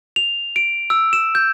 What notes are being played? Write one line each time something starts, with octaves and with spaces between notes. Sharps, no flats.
F7
D7
E6
E7
G6